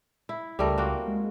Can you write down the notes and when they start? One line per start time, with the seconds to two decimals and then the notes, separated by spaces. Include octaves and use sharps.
0.29 E4
0.59 C#2 G3 A3 A#4
0.78 A#3 C4 F#4
1.08 G#3